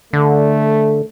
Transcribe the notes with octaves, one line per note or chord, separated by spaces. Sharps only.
D3 A3